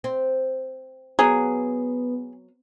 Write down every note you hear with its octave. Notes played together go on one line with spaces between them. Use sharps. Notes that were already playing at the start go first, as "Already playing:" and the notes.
C4
F#3 B3 G#4